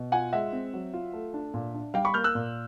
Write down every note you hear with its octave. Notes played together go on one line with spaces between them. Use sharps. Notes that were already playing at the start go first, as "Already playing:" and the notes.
Already playing: B2
F4 F#5 G#5
G#3 E5 F#5
C4
F#3
F4
A3
D4
A#2
D4
G3 F5 G5
B5 C#6
A#3 F6 G6
E6 F#6
A#2